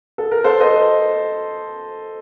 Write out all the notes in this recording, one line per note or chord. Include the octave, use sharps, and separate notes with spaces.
A4
A#4
A4 C5
C5 D#5